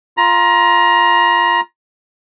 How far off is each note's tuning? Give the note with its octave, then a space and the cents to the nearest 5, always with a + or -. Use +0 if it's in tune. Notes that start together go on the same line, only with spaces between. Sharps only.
F4 +0 A#5 +25